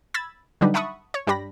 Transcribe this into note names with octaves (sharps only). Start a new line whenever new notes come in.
B5 E6 G#6 A6
D3 F#3 G3 D4 D#4 B4
E5 F#5 A5 B5 C#6 D#6
C#5
G2 G3 D4 G4 B5 A#6